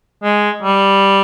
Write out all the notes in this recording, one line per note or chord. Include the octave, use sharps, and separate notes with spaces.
G#3
G3